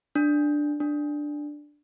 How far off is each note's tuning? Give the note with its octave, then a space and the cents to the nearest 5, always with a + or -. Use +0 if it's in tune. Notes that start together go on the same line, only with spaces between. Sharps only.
D4 +5
D4 +5